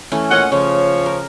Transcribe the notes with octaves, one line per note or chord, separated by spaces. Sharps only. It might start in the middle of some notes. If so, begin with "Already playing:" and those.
E3 A3 C#4
A#2 C#4 D#5 F#5
C#3 F3 C#5
A#4